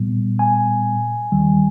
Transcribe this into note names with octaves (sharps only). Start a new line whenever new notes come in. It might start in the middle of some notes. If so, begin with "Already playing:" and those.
Already playing: A#2 G3 B3
G#5
D#2 D#3 G3